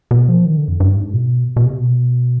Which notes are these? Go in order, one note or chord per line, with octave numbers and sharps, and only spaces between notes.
B2
F3
D#3
D3
F2
G2
G#2
B2
B2
C3
B2